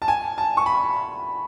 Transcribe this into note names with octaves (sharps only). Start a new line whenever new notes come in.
A5
G#5
A5
C#6
B5